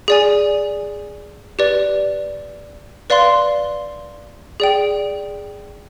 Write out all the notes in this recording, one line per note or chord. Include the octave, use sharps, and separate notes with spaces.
G#4 D5 G#5
G4 B4 D5
B4 D5 F5 C6
G#4 D5 G5